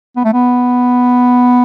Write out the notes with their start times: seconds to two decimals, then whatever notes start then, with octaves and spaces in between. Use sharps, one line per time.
0.16 B3
0.24 A3
0.33 B3